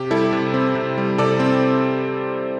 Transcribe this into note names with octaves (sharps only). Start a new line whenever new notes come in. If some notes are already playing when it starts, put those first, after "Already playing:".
Already playing: C3 G4
G3 E4 A4
C3
C4
C3
G3
C3 A4 D5
C4